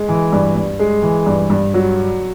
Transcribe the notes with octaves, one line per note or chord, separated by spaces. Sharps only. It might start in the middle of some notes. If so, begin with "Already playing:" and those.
Already playing: G#3
E3
G2
G2
G#3
E3
G2
G2
F#3